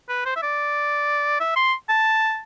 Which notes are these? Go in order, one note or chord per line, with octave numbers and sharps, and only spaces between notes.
B4
C5
E5
D5
E5
C6
A5